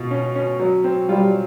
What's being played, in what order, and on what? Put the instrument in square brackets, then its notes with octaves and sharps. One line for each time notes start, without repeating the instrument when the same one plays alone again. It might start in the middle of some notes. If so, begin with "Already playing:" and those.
Already playing: [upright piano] B2 F4
C#4
C#4
F#3
C4
[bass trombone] G3 [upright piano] F4